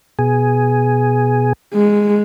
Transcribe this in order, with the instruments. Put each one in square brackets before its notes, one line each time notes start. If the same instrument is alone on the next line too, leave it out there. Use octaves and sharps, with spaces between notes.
[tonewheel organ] B2 G#4
[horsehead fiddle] G#3